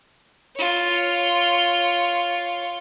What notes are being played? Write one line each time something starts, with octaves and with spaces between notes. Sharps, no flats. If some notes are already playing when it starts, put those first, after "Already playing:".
F4 C#5